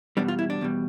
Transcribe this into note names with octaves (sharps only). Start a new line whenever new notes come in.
E2 B2 G3 D4
F4
E4
D4
E2 B2 G3